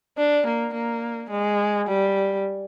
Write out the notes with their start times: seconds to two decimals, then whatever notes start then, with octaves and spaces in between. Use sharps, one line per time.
0.18 D4
0.47 A#3
0.74 A#3
1.30 G#3
1.87 G3